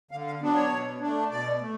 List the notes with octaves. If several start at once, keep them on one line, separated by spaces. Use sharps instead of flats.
D3 F5
F5
F#3 B3 D4
C#5
B2
A3 D4
B2 D5
A3